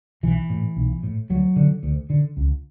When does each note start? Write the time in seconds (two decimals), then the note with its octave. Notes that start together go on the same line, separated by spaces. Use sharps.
0.23 B1 E3
0.50 A2
0.77 B1
1.03 A2
1.30 D2 F#3
1.56 D3
1.83 D2
2.10 D3
2.37 C#2